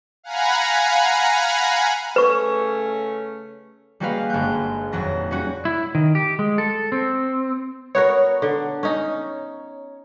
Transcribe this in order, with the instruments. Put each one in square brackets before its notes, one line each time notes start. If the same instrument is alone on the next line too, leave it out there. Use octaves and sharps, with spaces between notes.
[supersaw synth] F5 F#5 G#5 A#5 B5
[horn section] C#3 A3 C#4 [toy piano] B4 C#6
[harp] G3 G#3 A#3 F#4 B4 F5
G1 G#3 F#6 G6
D#1 F2 F#3 A#6
G3 C#4 F#4
[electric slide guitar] E4
D#3
G4
G#3
A4
C4
[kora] B3 F#4 A#4 [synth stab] C#5
[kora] D3
C#4 D#4